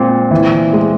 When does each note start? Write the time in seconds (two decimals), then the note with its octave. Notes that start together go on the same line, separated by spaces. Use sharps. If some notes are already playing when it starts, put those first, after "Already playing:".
Already playing: A#2 G#3 C4
0.31 E3
0.73 G#3